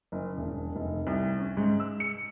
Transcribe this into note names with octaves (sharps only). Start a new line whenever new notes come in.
F#1
E1
F1
C2
C#4
G#2
E6
C#7